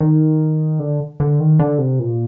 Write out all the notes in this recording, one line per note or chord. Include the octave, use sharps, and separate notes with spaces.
D#3
D3
D3
D#3
D3
C3
A#2